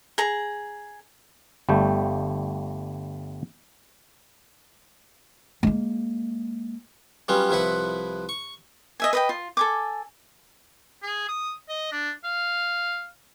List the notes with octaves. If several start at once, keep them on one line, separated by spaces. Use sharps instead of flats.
G#4 A#5
G1 G3 A3 G5
G#3 A#3
F#3 G3 B3 C#4 F4
C2 F3 E4 B4 F#5
C#6
D#5 E5 G#5
B4 D#5 G5
F4
A4 G#5 D6
G#4
D#6
D#5
D4
F5